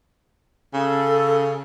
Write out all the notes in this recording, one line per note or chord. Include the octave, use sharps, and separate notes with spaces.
C#3 A4